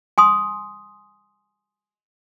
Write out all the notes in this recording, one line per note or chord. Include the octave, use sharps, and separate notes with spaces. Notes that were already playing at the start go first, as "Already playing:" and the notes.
G#5 C6 D#6